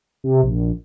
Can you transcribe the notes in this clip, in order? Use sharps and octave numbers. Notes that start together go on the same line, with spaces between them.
C3
A#1